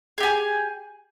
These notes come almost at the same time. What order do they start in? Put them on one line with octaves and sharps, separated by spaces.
G#4 G4 G#5